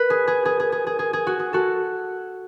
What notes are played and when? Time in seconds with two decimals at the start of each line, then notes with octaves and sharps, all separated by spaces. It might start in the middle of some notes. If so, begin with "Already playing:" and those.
Already playing: B4
0.10 G#4
0.27 G#4
0.45 G#4
0.60 G#4
0.72 G#4
0.87 G#4
0.99 G#4
1.13 G#4
1.27 F#4
1.39 G#4
1.53 F#4 A4